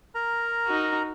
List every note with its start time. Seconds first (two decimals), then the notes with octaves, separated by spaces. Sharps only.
0.15 A#4 A#5
0.67 D#4 F#4